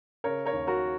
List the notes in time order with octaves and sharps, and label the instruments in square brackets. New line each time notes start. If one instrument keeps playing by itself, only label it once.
[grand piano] C#3 A#4 C#5
A#4 C#5
D#2
F#4 A#4